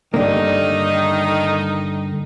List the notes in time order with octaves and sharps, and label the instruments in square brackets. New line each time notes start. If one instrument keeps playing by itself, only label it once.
[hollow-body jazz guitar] G2 D3 A#3 [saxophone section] D#3 A3 D#4